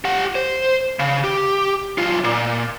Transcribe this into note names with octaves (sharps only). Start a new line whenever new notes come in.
G4 F#5
C5
C#3
G4
B1 F4
A#2